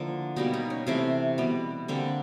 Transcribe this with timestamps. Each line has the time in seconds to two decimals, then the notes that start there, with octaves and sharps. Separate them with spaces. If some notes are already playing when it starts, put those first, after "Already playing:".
Already playing: D3 F3 A#3 E4
0.36 B2 G3 A#3 D#4
0.53 D#4
0.70 C#4
0.87 C3 E3 A3 C4
1.38 B2 G3 B3
1.88 D3 G3 A#3 C4